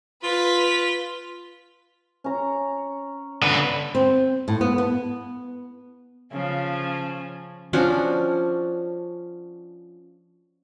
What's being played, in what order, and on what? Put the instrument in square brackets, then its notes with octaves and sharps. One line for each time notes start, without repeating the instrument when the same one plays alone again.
[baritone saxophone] F4 [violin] B4 B6
[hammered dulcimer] C#4 A#5
[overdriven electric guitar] D3 B4
[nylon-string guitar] C4
A2
B3
B3
[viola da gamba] C#3 F3 C#4
[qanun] F3 C#4 D4 F#4